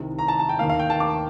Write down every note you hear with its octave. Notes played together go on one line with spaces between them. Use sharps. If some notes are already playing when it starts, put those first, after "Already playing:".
Already playing: C2 C3 D#3
A#5
A5
A5
G5
D#2 D#3 A#3 F5
F5
G5
A5
D6